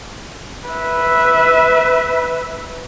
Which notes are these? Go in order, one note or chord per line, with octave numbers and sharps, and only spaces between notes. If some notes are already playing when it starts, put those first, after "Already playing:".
B4 E5